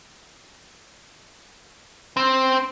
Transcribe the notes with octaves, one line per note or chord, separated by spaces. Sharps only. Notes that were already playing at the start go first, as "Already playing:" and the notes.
C4